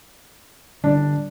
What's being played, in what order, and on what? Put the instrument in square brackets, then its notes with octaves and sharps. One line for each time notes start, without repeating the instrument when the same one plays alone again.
[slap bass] D3 G3 [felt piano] D4